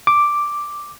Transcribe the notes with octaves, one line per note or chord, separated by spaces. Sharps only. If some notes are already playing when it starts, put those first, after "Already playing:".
D6